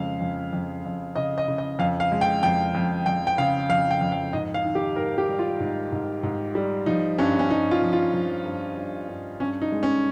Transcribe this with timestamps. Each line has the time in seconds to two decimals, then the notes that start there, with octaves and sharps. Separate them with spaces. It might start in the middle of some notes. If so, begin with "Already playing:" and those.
Already playing: F2 C#3 G#3 F5
0.20 F2
0.53 F2
0.85 F2
1.16 C#3 D#5
1.38 D#5
1.48 C#3
1.58 D#5
1.79 F2 F5
2.00 F5
2.12 G#3
2.21 G5
2.43 F2 G5
2.75 F2
3.06 F2 G5
3.27 G5
3.38 C#3 F5
3.69 F2 F5
3.91 G5
4.01 F2
4.12 F5
4.33 G#2 D#5
4.54 F5
4.65 D#3
4.75 G4
4.96 G#2 A#4
5.18 G4
5.29 G3
5.39 F4
5.60 G#2
5.92 G#2
6.23 G#2
6.55 G3
6.86 F3 D#4
7.18 G2 C#4
7.39 C#4
7.50 G2 D#4
7.71 F4
7.82 F3
7.93 F4
8.14 F3
8.46 G2
8.77 G2
9.09 G2
9.40 G2 C#4
9.62 D#4
9.72 G#3
9.83 C#4